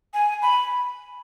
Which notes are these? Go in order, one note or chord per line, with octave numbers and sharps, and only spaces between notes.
G#5
B5